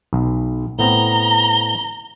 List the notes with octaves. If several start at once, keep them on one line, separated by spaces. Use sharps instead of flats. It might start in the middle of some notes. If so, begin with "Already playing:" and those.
B1
A2 B3 C4 A#5 G7